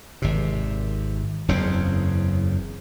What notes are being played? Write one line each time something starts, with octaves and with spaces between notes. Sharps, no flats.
G#1 C3
F#1 E2 C#3 C4